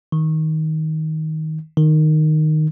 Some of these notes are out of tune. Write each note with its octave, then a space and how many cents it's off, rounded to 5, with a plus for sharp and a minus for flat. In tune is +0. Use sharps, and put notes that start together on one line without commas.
D#3 +15
D#3 -10